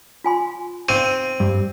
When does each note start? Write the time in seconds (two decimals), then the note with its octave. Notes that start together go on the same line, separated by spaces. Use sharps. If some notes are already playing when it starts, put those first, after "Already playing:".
0.24 F4 G#5 C6
0.89 C4 D#7
1.40 G2 G4